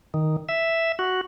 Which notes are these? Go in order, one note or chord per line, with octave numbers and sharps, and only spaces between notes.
D#3
E5
F#4